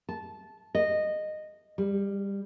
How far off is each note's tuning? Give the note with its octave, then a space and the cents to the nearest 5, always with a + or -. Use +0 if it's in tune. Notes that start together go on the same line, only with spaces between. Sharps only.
A5 -15
D#5 -15
G3 +20